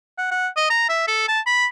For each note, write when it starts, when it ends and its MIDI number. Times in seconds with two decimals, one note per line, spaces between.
0.18 0.29 78
0.31 0.48 78
0.57 0.67 75
0.70 0.86 82
0.89 1.03 76
1.08 1.26 69
1.28 1.40 81
1.46 1.66 83